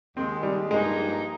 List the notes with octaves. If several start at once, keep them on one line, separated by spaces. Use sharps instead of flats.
D#2 D#3 G#3 C4
G3
G2 F3 G#3 A#3 D#4 G#4